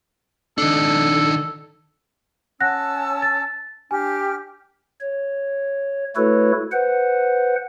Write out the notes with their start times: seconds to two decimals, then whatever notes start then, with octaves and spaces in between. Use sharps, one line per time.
0.58 D#3 D4 A4
2.61 C#4 F#5 A5 E6 F#6 A#6
3.22 A6
3.91 D4 G4 G#5 F6
5.01 C#5
6.16 A3 E4 F#4 A4 B4 C#5
6.72 B4 C5 F#5